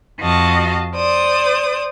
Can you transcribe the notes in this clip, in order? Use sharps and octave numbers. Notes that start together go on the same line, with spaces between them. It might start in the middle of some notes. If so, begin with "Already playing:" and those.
F2 F#4 D#5 F5 A5
C5 D5 D#6